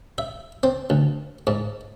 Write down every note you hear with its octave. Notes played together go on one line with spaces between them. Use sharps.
E5
C4
D2
G#2